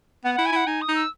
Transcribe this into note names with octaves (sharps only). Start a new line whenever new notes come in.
B3 F#5
E4 F#5
G#5
E4 F#5
D#4 G#5
D#6
D#4
E6